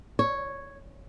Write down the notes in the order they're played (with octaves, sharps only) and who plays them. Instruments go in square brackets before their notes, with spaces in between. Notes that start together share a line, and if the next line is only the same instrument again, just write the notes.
[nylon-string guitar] C#5